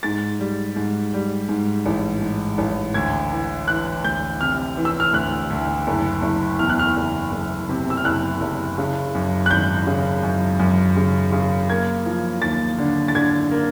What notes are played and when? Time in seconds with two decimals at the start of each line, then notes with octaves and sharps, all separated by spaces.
0.03 G#2 A6
0.39 G3
0.76 G#2
1.13 G3
1.49 G#2
1.86 A1
2.22 G#2
2.58 A1
2.94 D2 G#6
3.32 E3
3.68 E3 F#6
4.04 D2 G6
4.41 C3 F6
4.77 E3
4.85 E6
5.00 F6
5.13 D2 F#6
5.50 D2
5.87 F#1
6.22 F#1
6.59 E2 F6
6.69 F#6
6.79 F6
6.96 F#1
7.32 F#1
7.69 C3
7.90 E6
7.97 F6
8.05 F#1 F#6
8.41 F#1
8.78 C#3
9.15 F#2
9.46 F#6
9.50 G#1 G6
9.87 C#3
10.23 F#2
10.60 F#2
10.96 C#3
11.32 C#3
11.70 A#3 G#6
12.06 F3
12.42 D#2 A6
12.78 D3
13.08 A6
13.15 D3 G#6
13.51 A#3